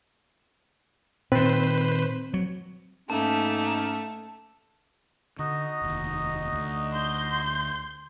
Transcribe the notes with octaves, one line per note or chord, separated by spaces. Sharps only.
A#2 D#3 C4 B4 C5
F#3
G#2 A3 A#3 C#4 D#4 A5
D3 D#4 F#4 D#5
F1 D#2
D2
C6 G6